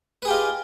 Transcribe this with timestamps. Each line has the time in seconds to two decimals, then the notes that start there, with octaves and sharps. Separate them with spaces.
0.22 B4
0.25 G#4
0.28 G4
0.31 F4
0.33 D#5